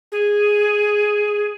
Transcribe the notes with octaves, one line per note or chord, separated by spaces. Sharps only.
G#4